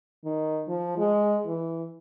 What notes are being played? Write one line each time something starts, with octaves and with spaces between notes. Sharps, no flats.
D#3
F3
G#3
E3